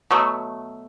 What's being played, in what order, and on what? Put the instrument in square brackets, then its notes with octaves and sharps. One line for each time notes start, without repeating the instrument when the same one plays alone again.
[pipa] B2 F#3 A3